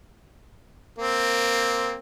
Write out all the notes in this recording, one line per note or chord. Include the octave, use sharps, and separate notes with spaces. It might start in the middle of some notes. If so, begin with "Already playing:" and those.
A#3 C4